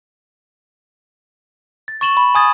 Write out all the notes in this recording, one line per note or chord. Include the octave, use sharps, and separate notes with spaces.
A6
C#6 A6 E7 F#7 G7
B5
G#5 D#6 G#6 A6